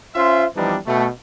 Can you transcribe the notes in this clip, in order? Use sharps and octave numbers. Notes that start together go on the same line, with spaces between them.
C#4 F4 C5 E5
E3 F3 G3 B3 D4 D#4
B2 A3